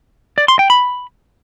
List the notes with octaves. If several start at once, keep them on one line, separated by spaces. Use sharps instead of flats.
D5
C6
G5
B5